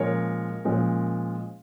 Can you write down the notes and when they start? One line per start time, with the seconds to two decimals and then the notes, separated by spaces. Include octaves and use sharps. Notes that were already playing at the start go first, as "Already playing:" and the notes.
Already playing: A#2 F3 G#3 C#4 A#4 C#5
0.65 A#2 F3 G#3 C#4